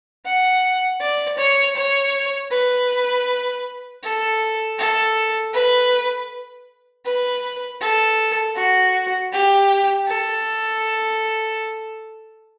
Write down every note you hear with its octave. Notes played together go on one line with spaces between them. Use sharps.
F#5
D5
C#5
C#5
B4
A4
A4
B4
B4
A4
F#4
G4
A4